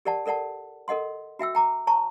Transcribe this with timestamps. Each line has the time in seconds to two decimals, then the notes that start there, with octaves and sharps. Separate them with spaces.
0.05 G4 A#4 D5 F#5 A5
0.26 A4 A#4 D5 F#5 A5
0.88 A4 A#4 D#5 F#5 C6
1.39 F#4 E5 G5 E6
1.55 G5 A#5 D6
1.87 C#5 A5 A#5 C#6